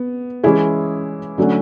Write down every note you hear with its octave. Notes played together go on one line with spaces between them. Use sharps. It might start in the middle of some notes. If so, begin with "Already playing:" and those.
Already playing: B3
E3 G#3 C#4 E4 G#4
D3 F#3 A3 C#4 F#4